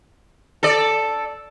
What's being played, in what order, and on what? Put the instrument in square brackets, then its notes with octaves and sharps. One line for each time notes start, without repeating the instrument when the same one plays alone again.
[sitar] A4 D5